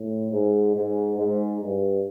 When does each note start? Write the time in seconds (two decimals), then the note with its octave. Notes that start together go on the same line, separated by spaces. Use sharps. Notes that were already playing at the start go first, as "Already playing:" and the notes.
Already playing: A2
0.32 G#2
0.75 G#2
1.18 G#2
1.61 G2